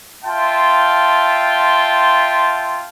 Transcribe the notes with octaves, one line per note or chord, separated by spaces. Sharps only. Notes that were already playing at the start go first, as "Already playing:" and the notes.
F4 E5 G5 A5 C6